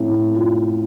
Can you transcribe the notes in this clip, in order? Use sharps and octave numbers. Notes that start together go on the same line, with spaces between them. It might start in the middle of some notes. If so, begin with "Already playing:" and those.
Already playing: A2 C4
F4